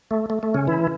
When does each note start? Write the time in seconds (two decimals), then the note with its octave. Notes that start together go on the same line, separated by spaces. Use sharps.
0.11 A3
0.30 A3
0.43 A3
0.54 C#3 C#4
0.67 E3 E4